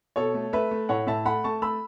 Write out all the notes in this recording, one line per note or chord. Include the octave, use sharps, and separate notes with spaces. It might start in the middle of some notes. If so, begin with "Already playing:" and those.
B2 A4 C#5
A3
A3 B4 E5
A3
A2 C#5 F#5
A2 E5 A5
A3 F#5 B5
A3 A5 C#6
A3 B5 E6